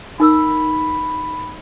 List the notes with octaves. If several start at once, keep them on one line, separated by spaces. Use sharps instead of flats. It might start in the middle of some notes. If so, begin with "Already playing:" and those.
D#4 A#4 B5 E6